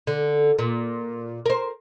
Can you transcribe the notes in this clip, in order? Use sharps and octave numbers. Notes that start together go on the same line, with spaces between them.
D3
A#2
A#4 C5